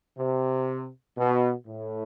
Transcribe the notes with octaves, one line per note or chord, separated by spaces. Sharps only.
C3
B2
A2